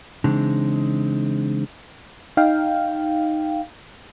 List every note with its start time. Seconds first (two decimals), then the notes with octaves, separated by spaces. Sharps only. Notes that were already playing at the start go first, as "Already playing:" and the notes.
0.24 C#3 E3 G#3 C4 D4 D#4
2.37 D#4 F5 G5